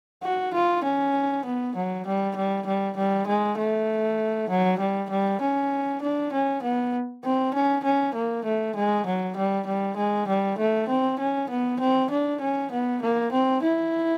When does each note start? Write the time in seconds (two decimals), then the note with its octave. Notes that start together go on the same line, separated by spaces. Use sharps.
0.23 F#4
0.53 F4
0.84 C#4
1.45 B3
1.75 F#3
2.06 G3
2.36 G3
2.66 G3
2.97 G3
3.27 G#3
3.58 A3
4.49 F#3
4.79 G3
5.10 G3
5.41 C#4
6.01 D4
6.32 C#4
6.63 B3
7.24 C4
7.54 C#4
7.84 C#4
8.14 A#3
8.45 A3
8.75 G#3
9.06 F#3
9.37 G3
9.67 G3
9.97 G#3
10.27 G3
10.58 A3
10.88 C4
11.19 C#4
11.49 B3
11.80 C4
12.10 D4
12.41 C#4
12.71 B3
13.02 A#3
13.32 C4
13.63 E4